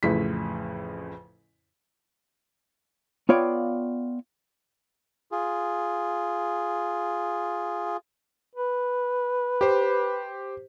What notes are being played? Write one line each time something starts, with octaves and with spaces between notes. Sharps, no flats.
A1 F2 A2 C#3 B6
B3 F4 C#5 D5 F5 G5
F4 G#4
B4
G4 C5